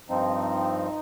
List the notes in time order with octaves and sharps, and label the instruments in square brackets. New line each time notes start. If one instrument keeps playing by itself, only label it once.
[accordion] G2 F3 C4 D#4